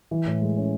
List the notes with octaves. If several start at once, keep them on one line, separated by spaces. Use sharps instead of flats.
E3
A2
G#3
C#4